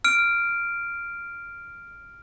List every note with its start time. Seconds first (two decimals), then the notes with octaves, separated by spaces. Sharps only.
0.05 F6 D7